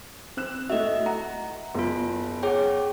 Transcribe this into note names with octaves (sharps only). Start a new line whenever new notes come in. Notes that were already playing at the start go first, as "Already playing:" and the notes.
C4 F#6 E7
A2 A3 F#4 D#5 E5
F#5 A#5
F#1 B3 F4
G#4 C#5 F#5 G5 D6